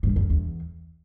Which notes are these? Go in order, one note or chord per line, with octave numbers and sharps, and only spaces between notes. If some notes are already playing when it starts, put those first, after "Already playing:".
G#2
F#2
E2